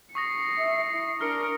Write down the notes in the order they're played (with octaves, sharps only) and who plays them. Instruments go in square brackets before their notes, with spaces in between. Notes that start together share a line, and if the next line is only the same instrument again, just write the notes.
[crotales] C#6 D#6 A#6 [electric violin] C7 C#7
[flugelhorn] E5
E4
[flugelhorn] D4 [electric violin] A#4 [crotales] F6 C#7